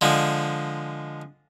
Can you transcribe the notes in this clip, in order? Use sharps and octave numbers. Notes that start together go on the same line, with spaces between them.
D3 F3 G#3